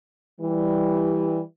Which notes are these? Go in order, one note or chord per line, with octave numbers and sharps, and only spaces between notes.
E3 G3